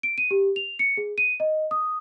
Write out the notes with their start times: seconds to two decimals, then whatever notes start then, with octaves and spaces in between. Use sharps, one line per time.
0.03 D7
0.18 D#7
0.31 G4
0.56 F7
0.79 C#7
0.97 G#4
1.18 D#7
1.40 D#5
1.71 D#6